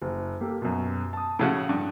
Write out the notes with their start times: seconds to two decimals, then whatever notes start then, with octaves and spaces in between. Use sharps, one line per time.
0.02 F#1
0.41 A#3 G4 A4
0.62 F#2 B2
1.13 A5 D#6
1.39 A2 C#3 F#4
1.69 G2